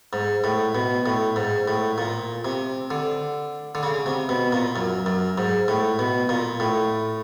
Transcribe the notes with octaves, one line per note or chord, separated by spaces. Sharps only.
G#2
A2
B2
A2
G#2
A2
A#2
C3
D3
D3
C#3
C3
B2
A#2
F#2
F#2
G#2
A2
B2
A#2
A2